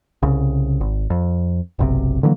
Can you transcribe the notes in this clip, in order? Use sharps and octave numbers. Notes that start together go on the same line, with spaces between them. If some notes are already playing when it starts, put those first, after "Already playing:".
C2 C#3
G#1
F2
F#1 B1 C3
D3 E3 F#3 A#3